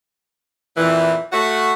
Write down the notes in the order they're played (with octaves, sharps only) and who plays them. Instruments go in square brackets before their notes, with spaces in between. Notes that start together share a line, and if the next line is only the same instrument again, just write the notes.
[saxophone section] F2 A#2 E3
A3 F#4